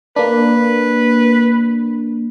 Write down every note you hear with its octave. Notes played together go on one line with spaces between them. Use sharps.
A#3 D4 B4